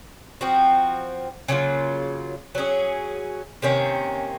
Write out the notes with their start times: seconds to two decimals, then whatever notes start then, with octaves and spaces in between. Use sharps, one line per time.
0.41 F3 C4 F#4
1.48 C#3 F#3 A#3 F4
2.55 F#3 C#4 G#4
3.62 C3 D#3 A#3 C#4